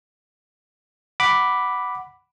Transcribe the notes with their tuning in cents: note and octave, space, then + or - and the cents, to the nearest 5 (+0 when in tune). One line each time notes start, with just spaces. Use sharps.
F#5 +5 B5 +0 D6 +0